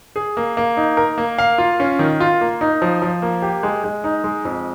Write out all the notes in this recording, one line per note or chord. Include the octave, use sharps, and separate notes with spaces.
G#4
A#3
A#3
D#4
A#4
A#3
F5
F4
C#4
D#3
F4
A#3
D#4
F3
F3
A#3
G4
G#3
G#3
D#4
G#3
F2